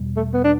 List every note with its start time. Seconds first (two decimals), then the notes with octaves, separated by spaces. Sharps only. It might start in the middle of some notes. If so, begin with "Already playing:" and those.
Already playing: E2 B2 G3
0.17 A3
0.34 B3
0.44 D4